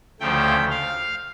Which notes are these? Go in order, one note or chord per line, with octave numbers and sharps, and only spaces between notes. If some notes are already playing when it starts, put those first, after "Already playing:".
D2 C#3 F3 A3 G5
F5